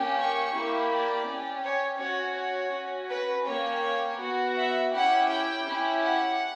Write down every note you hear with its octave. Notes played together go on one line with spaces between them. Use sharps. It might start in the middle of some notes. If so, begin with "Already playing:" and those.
Already playing: A#3 C#4 G4
C#6
A#3 E4 G4
D5
C#4 G4
C#5
C#4 F#4 C#5
C#5
C#4 F#4
B4
A#3 C#4 G4 C#5
B3 F#4
E5
C#4 E4 G4 F#5
G5
C#4 E4 G4
F#5